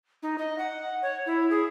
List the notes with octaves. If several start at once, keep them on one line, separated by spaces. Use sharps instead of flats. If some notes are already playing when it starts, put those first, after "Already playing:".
D#4
D#5
F#5
C#5
E4
G#4